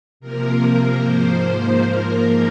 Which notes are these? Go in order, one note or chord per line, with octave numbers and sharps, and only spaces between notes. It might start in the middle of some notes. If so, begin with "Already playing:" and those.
C3 F3 A#3 A#4
G#2 F3 A#3 C5
G#2 F3 A#3 A#4